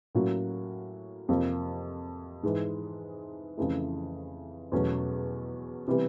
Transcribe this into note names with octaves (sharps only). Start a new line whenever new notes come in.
A2 F#3 A#3 C#4 F#4
F2 C3 F3 A#3
G#2 E3 G#3
F2 C#3 E3 A3
E2 B2 F#3 A3 C#4
C3 E3 G3 B3